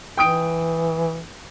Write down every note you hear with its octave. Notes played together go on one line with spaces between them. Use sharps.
E3 G5 D#6 D7